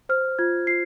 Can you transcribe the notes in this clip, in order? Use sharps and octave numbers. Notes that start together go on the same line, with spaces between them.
C5 F6
F4 G#6
F4 C7